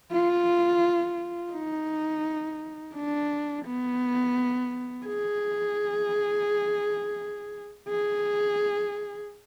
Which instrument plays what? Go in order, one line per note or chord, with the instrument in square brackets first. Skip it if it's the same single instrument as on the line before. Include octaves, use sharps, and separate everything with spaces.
[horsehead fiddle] F4
D#4
D4
B3
G#4
G#4